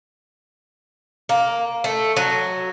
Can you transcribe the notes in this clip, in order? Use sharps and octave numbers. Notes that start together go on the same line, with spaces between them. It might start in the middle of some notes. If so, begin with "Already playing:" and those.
A#3
A3
F#3